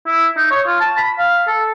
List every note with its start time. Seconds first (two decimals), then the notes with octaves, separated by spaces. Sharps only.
0.06 E4
0.37 D#4
0.51 C#5
0.67 F4
0.80 A5
0.97 B5
1.18 F5
1.47 A4